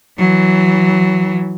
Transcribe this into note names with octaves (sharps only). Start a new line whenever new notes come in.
E3 F#3